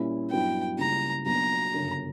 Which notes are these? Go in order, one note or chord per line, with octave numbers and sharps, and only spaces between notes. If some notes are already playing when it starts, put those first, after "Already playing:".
Already playing: A#2 G3 C#4 E4
G2 F#3 B3 E4 G5
C#2 C#3 G3 A#3 E4 A#5
B1 B2 F#3 A#3 D4 A#5
G1 F#2 C#3